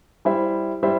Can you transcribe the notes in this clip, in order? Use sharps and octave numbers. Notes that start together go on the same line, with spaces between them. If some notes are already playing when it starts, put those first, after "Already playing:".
G3 E4 C5 E5
G3 E4 C5 E5